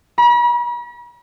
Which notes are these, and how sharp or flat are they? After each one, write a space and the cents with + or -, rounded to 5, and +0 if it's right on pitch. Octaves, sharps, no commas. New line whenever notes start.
B5 -45